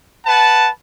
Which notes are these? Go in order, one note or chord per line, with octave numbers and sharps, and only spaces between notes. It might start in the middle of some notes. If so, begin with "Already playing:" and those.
B4 F#5 A5